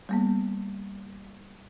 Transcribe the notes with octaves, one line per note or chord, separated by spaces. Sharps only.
G3 A#3 B3